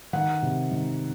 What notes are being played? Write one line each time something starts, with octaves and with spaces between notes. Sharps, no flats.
D#3 F#5
C3
D#3